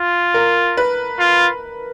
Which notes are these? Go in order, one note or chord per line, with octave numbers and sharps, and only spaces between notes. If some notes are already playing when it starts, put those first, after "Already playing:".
Already playing: F4
A#4
B4
F4